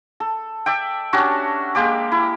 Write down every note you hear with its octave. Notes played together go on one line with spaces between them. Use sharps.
A4
D5 E5 G5
C#4 D4 F#4 G4
G#3 A#3 G4 D5
E4